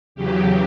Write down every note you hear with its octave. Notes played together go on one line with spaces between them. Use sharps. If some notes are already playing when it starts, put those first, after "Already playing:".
E2 C#3 F#3 G4